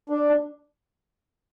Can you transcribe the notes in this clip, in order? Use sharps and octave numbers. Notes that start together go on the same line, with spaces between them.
D4